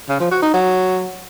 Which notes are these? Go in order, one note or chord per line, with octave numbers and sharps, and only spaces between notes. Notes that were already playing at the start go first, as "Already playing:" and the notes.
C#3
F3
F#4
D#4
F#3